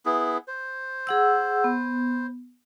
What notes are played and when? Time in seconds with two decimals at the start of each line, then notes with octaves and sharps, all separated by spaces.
0.05 B3 E4 G#4
0.48 C5
1.07 G#4 F#5 E6
1.64 B3